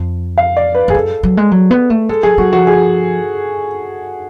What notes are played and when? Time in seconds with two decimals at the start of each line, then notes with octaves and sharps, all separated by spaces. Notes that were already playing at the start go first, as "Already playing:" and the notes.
Already playing: F2
0.38 F5
0.57 D5
0.75 B4
0.88 F2 G#4
0.94 F#2 A4
1.23 F#3
1.37 G#3
1.51 F#3
1.71 B3
1.90 A3
2.09 G#3 A4
2.23 F#3 G#4
2.38 F#3 F#4
2.52 F3 F#4
2.67 G#4